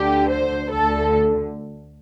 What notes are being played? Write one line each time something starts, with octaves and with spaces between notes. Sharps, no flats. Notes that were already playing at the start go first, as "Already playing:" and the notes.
Already playing: D2 D3 G4
C5
D2 D3 A4